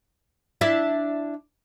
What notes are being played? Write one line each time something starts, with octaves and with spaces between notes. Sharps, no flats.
D4 E4 E5